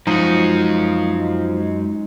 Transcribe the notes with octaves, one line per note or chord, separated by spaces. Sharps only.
F#2 F3 G#3 D#4 F#4